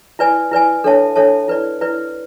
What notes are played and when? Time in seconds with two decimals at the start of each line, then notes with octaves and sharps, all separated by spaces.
0.19 E4 B4 D5 G#5
0.52 E4 B4 D5 G#5
0.84 D4 A4 C#5 E5 A5
1.16 D4 A4 C#5 E5 A5
1.48 E4 B4 D5
1.81 E4 B4 D5